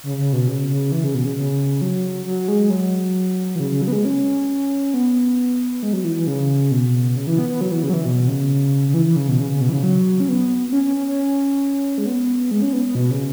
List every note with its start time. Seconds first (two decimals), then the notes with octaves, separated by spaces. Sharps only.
0.03 C#3
0.18 C#3
0.33 B2
0.48 C#3
0.69 C#3
0.92 E3
1.04 C#3
1.14 B2
1.25 C#3
1.36 C#3
1.81 F#3
2.26 F#3
2.48 G#3
2.70 F#3
3.55 E3
3.60 C#3
3.70 C#3
3.82 F#3
3.88 B3
3.93 G#3
4.05 C#4
4.94 B3
5.83 G#3
5.93 F#3
6.04 E3
6.16 E3
6.27 C#3
6.71 B2
7.16 C#3
7.27 E3
7.38 B3
7.49 B3
7.61 F#3
7.72 E3
7.83 C#3
7.90 F#3
7.94 E3
8.06 B2
8.28 C#3
8.89 C#3
8.94 E3
9.05 E3
9.16 C#3
9.29 B2
9.39 C#3
9.51 C#3
9.61 B2
9.69 E3
9.72 C#3
9.83 F#3
10.20 C#4
10.29 B3
10.68 B3
10.73 C#4
10.83 C#4
10.95 C#4
11.07 C#4
11.98 G#3
12.06 B3
12.51 G#3
12.62 C#4
12.73 B3
12.85 B3
12.95 B2
13.11 C#3